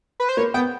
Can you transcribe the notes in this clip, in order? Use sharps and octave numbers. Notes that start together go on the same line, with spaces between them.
B4
C5
A#3 C#5
B3 G5